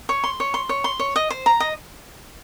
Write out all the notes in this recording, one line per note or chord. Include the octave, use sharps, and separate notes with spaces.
C#5
C6
C#5
C6
C#5
C6
C#5
D#5
C5
A#5
D#5